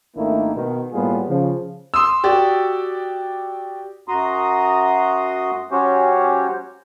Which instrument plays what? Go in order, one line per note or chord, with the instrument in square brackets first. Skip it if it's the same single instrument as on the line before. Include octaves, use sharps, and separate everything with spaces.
[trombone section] G#1 D#3 A3 A#3 D4 E4
B2 D#3
A2 G3 A#3 B3 F4 G#4
C#3 F3
[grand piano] C6 D#6 E6
F#4 G4 D5
[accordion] F#2 F#4 A#5 C6 D#6
F#3 C#4 F#4 G4 C5 C#5